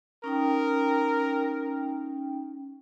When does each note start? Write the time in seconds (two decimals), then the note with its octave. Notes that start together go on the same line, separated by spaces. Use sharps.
0.24 C#4 D#4 A#4 G5